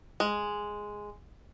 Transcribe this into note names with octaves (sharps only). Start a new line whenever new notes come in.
G#3